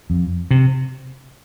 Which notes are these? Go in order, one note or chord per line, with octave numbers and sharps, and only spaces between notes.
F2
C3